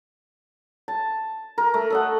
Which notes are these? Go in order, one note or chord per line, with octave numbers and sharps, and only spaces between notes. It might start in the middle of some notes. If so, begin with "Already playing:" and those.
A5
A#4
A3
A4 D#5 F#5